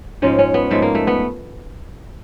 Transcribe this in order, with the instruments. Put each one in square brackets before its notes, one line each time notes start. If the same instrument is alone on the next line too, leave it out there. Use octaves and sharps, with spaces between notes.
[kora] G#2 F3 G#3 C#4
C#4
B3
G#2 F3 G#3 A3
A#3
A3
B3